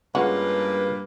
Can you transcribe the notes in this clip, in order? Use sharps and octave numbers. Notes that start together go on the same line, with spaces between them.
G2 G#3 A#3 C#4 F4 F#4 B4